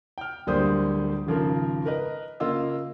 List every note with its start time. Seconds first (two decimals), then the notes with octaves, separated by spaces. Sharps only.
0.18 G5 F6
0.47 D1 D2 G3 A#3 C5 D#6
1.27 G#1 C#3 F3 A#4
1.86 A#4 B4 D#5
2.40 C#3 A#3 F4 D#5 E6